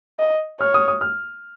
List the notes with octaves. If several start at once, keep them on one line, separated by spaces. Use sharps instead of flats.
D#5
C#5 F6
D#6
D#6
F6